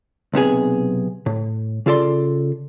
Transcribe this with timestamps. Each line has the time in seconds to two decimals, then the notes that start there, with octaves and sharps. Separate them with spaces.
0.33 B1 C3 B3 G#4
1.26 A2
1.86 C#3 F4 A4 D5 C6